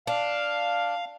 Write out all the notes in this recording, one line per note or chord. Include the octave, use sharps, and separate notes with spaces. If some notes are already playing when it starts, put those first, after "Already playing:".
D4 F5